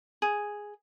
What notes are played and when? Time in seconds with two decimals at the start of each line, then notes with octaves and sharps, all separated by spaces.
0.22 G#4